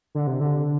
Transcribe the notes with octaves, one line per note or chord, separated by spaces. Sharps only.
D3
C3
D3